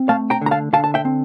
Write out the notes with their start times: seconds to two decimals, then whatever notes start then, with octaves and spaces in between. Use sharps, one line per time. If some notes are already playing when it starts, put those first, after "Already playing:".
Already playing: C4
0.09 A3 F5 A5
0.30 G5 A#5
0.41 D3 A#5
0.51 F5 A5
0.73 D3 F5 A5
0.84 A5
0.94 E5 G5
1.05 C4